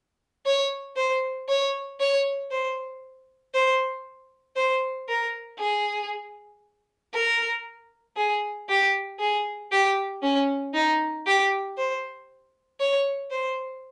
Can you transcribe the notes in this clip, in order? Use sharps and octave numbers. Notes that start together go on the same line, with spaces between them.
C#5
C5
C#5
C#5
C5
C5
C5
A#4
G#4
A#4
G#4
G4
G#4
G4
C#4
D#4
G4
C5
C#5
C5